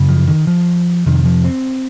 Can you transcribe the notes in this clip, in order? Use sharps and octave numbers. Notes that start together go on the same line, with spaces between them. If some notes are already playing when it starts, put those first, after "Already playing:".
Already playing: F#2 C#3
F3
D#3
F3
F2 C3 D#3
F3
C4